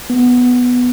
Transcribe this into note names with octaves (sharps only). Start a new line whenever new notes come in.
B3